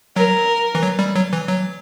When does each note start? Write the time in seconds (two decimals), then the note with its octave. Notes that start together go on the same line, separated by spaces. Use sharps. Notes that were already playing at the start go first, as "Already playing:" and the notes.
0.16 F#3 A#4
0.75 E3
0.83 F#3
0.99 G3
1.15 F#3
1.33 E3
1.48 F#3